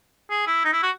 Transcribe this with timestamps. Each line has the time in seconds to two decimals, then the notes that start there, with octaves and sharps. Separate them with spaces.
0.30 G#4
0.47 E4
0.65 D#4
0.73 E4
0.83 F#4